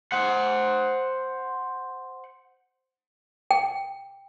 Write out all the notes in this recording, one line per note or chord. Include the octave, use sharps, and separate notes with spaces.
C5 F#5
G5